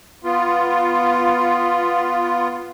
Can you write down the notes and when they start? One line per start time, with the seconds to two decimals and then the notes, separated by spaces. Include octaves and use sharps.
0.24 B3 F4